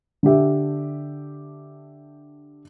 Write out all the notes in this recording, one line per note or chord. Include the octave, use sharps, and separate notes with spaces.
D3 D4 G4 E5